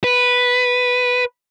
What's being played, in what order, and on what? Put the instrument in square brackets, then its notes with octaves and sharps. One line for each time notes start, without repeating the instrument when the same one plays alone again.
[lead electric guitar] B4